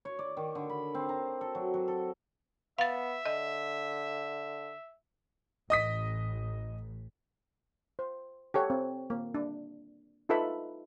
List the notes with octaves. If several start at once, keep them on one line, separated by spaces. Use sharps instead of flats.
C#5
D5
D#3
D3
B5
C4
A#5
A4
F#3
F#3
A4
B3 E5 F5 A6
D3 D#5
A1 D#5 D#6 B6
C5
G4 A4 C#5 F#5
C4
A#3
D4
D#4 F4 A4 B4 E5 B5